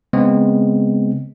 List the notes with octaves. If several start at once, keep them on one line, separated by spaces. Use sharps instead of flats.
C#3 G#3 B3 C4